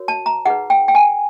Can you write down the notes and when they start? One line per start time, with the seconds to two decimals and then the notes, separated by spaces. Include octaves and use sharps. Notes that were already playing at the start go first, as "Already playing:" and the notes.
Already playing: F#4 A#4 C#5
0.08 A5
0.26 A#5
0.46 D#4 G#4 B4 F#5
0.70 G5
0.88 G5
0.95 G#5